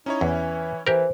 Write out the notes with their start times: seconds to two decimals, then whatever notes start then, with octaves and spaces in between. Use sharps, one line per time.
0.06 C#4 D#4 E4 C#5
0.21 E2 E3
0.87 E3 G4 A#4 C5